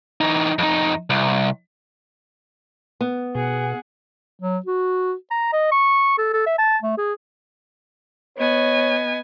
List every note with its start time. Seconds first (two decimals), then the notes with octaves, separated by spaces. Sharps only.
0.21 E3 D#4
0.59 F2 D#4
1.10 C2
3.01 B3
3.35 B2 G#4 F#5
4.40 F#3
4.66 F#4
5.31 A#5
5.53 D#5
5.71 C#6
6.18 A4
6.33 A4
6.46 E5
6.59 A5
6.83 A3
6.98 G#4
8.38 B3 C#5 D#5 G#5